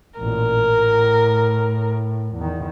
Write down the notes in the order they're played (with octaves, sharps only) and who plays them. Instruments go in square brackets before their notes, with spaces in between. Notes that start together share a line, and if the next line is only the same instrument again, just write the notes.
[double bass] A1 A#2 [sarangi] A#4
[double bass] A2
E2 D#3